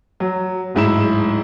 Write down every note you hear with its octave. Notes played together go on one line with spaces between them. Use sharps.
F#3
D1 G#2 E4 E7